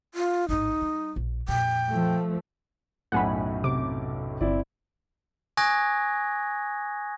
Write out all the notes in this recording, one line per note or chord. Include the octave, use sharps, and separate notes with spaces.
F4
A1 G#2 D#4
G3
A#1
F2 A#2 G5
F3 A3
B1 F#2 A2 F#5 G#5 B5
C3 D6
G1 C4 E4 D5
G#5 C#6 D#6 F#6 G#6 A#6